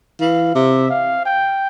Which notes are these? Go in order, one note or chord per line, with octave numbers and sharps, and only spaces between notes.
E3 F5
C3 E5
F5
G5